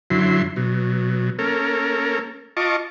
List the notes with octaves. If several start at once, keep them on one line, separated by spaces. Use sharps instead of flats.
F#2 D3 F#3 E4 C6
B2 F#3
A#3 C#4 A4 A#4
F4 D#5 A5 C#6 D6